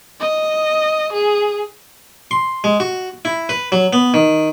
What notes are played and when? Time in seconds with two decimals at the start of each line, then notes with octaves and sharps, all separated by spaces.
0.21 D#5
1.13 G#4
2.31 C6
2.64 G#3
2.80 F#4
3.25 E4
3.49 B4
3.72 F#3
3.93 B3
4.14 D#3